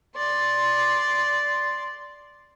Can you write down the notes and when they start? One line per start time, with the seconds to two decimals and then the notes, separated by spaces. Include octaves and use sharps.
0.16 D5 C6